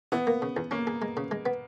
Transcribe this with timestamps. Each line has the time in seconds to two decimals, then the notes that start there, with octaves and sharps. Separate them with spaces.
0.12 E3 B3
0.27 A#3
0.42 C#3
0.57 E2
0.71 A#3 C#4
0.87 G#4
1.02 G#3
1.17 C#3
1.31 G#3
1.46 B3